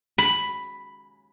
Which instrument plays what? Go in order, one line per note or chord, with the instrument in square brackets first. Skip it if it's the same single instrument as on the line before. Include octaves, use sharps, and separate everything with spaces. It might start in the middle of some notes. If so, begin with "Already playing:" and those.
[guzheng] B5